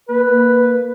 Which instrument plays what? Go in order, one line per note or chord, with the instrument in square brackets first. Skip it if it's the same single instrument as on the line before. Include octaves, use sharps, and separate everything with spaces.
[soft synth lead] A#3 [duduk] B4